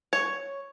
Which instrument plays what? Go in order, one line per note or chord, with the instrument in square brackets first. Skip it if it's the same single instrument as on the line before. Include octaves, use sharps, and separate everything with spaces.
[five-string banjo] C#5